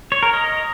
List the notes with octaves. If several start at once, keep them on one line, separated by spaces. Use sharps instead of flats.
C#5
A#4
D#5